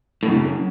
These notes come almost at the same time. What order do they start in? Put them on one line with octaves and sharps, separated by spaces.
A2 F#2 C#3